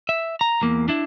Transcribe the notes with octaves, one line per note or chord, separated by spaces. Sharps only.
E5
A#5
E2 A#3
D4 E4